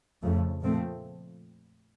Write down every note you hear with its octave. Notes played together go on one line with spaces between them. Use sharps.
F2 C#3 F3 A3
A#2 F3 A3 C4